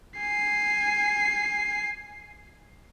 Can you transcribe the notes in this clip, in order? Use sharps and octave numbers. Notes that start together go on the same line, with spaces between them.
G#5 C7